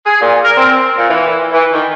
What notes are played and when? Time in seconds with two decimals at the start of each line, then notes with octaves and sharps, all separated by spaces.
0.06 G#4
0.21 A#2
0.44 A#4
0.57 C4
0.97 A#2
1.10 E3
1.53 E3
1.72 D#3